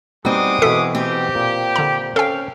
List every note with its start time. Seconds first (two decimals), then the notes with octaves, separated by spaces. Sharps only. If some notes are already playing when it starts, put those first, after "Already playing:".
0.25 G3 G#3 B3 C4 D#4 F#4 D6 D#6
0.62 B2 E3 A4 B6
0.95 C4 G4
1.35 A#2
1.76 D3 A#5
2.16 C#4 A4 F5 G5